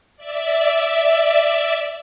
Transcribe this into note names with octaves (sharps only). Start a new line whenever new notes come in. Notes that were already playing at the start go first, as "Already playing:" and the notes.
D5 E5